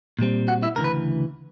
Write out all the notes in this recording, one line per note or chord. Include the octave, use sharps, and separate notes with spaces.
A#2 G3 C4
F#4 F#5
E4 E5
D2 C#3 E3 A#4
B4